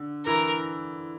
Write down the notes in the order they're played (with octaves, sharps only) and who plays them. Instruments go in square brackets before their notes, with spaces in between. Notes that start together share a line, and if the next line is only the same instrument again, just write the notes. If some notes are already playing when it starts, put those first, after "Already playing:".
Already playing: [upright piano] D3
[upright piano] E3 [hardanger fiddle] A#4